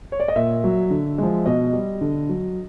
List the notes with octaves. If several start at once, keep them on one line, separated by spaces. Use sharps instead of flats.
C#5
D5
D#5
A#2 E5
F#3
D3
F3 G#3
B2 D#5
G3
D3
F#3